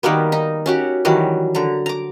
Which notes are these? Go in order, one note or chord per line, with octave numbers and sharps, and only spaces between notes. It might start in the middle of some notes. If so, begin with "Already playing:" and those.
D#3 G3 A#3 B3
D#4
C#4 F#4 G4
D#3 E3 F#3 G3
D3 A#5
A#5 D6